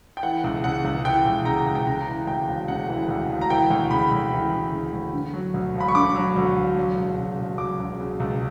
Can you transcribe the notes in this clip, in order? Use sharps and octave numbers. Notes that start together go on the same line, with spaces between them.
G5
E3 F#5
C#2
C#3 F#5
C#2
E3 G5
C#2
C#3 A#5
C#2
G5
C#3 A#5
E3
D2 G5
E1
C#3 F#5
E3
D2
E1
A#5
E3 G5
D2
C#3 B5
D2
E3
D2
C#3
D2
D3
F#3
D2
E1
B5
C#6
D3 D6
F#3
D2
E1
F#3
C#2
C#3
C#2
F#3 D6
C#2
C#3
C#2